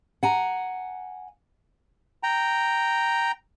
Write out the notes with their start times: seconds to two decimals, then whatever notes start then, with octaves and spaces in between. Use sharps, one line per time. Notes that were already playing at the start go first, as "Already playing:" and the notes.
0.23 F#5 G#5 A#5
2.23 G5 A#5